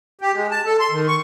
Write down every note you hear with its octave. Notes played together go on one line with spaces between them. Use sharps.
G4
G#3
A5
A4
C6
D#3
C#6